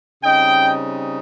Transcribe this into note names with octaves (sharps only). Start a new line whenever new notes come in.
C#3 G3 C4 D#4 D#5 G5